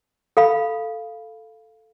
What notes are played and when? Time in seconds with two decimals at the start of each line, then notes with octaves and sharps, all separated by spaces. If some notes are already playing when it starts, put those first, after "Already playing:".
0.37 A4 F5 B5